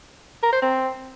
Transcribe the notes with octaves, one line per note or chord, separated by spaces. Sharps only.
A#4
C5
C4